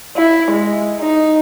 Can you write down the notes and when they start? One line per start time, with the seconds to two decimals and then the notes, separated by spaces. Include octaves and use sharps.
0.17 E4
0.51 G#3
1.00 D#4